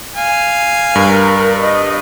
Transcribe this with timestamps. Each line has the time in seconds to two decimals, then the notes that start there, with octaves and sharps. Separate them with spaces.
0.16 F5 G#5
0.95 G2 A#4
1.64 D#5